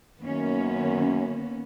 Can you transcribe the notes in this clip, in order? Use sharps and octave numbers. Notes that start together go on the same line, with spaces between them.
F#2 D#3 A#3 B3 C#4